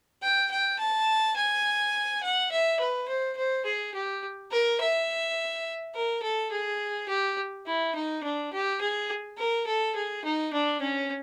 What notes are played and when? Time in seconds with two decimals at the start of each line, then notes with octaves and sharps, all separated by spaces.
0.22 G5
0.51 G5
0.79 A5
1.36 G#5
2.23 F#5
2.51 E5
2.80 B4
3.08 C5
3.37 C5
3.65 G#4
3.94 G4
4.51 A#4
4.81 E5
5.95 A#4
6.23 A4
6.52 G#4
7.08 G4
7.66 E4
7.95 D#4
8.23 D4
8.53 G4
8.81 G#4
9.38 A#4
9.67 A4
9.95 G#4
10.25 D#4
10.53 D4
10.81 C#4